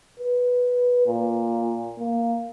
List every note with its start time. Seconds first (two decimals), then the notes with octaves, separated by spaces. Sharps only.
0.20 B4
1.06 A#2
1.98 A#3